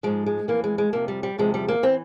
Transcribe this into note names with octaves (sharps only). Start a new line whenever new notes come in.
G#2 F3 G#3
G#3
F2 E3 A#3
G#3
G#3
F2 C3 F3 A#3
G3
G3
E2 C3 F3 G#3
G3
A#3
E3 C4